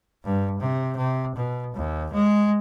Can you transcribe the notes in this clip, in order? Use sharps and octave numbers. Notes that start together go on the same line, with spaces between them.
G2
C3
C3
B2
D#2
G#3